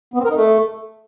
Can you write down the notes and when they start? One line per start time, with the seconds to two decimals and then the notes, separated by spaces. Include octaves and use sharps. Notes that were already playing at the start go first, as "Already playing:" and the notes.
0.14 B3
0.19 C4
0.24 A#4
0.30 D#4
0.35 A3